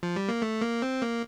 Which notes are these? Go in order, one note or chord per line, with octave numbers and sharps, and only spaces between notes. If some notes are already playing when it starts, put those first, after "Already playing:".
F3
G3
A#3
A3
A#3
C4
A#3